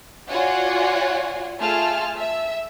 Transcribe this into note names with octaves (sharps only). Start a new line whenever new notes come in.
F4 F#4 C#5 D5 F#5 G#5
A3 F4 G#4 G#5 A5 F6
E5 E6